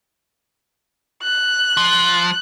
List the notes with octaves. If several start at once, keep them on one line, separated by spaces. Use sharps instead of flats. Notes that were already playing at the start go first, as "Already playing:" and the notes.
F#6
F3